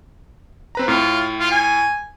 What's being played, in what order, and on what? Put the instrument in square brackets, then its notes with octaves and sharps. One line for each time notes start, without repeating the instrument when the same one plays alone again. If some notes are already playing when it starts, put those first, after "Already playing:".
[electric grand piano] C4 B4 A#5
[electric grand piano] A2 [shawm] F4
[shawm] F4
G#5